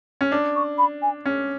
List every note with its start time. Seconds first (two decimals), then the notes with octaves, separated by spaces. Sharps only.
0.21 C#4
0.32 D4
0.56 C#6
0.78 B5
1.02 G#5
1.26 C#4